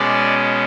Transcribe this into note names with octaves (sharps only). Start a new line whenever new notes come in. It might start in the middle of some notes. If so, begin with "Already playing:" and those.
Already playing: B2 G#3 C#4 D5